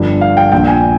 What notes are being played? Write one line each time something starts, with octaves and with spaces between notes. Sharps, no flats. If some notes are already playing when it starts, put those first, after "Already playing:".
Already playing: G1 G2 F3
F5
G5
A#1 A#2 F3 G5
G#5